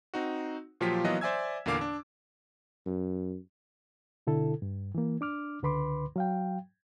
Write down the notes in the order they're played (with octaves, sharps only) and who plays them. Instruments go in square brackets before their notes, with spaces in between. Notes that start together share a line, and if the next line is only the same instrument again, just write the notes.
[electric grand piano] C4 D#4 F#4
A#2 F3 F#3 F4 G4 B6
E3 F#3 A#3 B3 F4 D#5
C5 D5 E5 G#5 E6 G#6
E2 A#2 D3 A#3 F5 D6
D4
[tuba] F#2
[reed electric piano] B2 D3 E4 A4
G2
E3 A#3
D4 D6 F6
C#2 D3 B4 B5 C6 D6
F#3 F5 G5